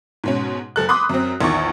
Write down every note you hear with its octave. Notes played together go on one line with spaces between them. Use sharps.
G#2 B2 C#4
F#1 A4 F#6
B5 C6 D6 D#6 F#6
F#2 C4
A#1 E2 D#3 C#6